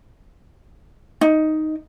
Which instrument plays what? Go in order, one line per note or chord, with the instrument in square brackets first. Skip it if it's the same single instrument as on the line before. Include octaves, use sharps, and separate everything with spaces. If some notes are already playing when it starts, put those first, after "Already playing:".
[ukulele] D#4